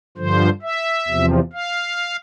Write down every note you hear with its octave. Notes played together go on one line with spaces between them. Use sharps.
G2 D3 F3 C5
E5
E2 C3 F3
F5